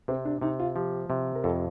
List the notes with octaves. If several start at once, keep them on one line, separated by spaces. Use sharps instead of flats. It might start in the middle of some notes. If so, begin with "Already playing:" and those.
C3 C4
D4
C3 D#4
F4
F3 G4
C3
A#4
F2 A4